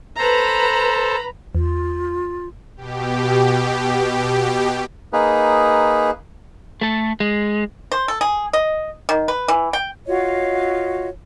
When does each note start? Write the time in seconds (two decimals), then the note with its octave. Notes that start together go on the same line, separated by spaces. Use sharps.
0.18 A4 B4 C5 A#5 B5
1.55 E2 F4
2.76 B2 G4
5.13 A#3 D#4 G#4 B4
6.81 A3 A4
7.20 G#3
7.92 C5
8.08 A4
8.21 G#4
8.53 D#5
9.09 D#3
9.28 B4
9.48 E3
9.73 G5
10.06 F4 F#4 C#5 D#5